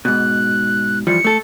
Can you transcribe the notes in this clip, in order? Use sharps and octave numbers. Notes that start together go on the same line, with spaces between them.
G#2 B2 F#6
E3 F3 G3 C#7
A3 A4